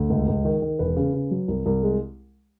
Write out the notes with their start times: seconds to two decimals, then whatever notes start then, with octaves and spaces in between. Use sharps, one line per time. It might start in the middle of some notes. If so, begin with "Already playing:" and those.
Already playing: D2
0.10 C#2
0.28 C#2
0.45 D#3
0.62 D#3
0.79 E1 B4
0.96 C#3
1.14 C#3
1.31 F#3
1.48 C2
1.66 C2
1.83 G#3